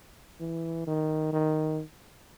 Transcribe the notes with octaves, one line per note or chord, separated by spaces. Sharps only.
E3
D#3
D#3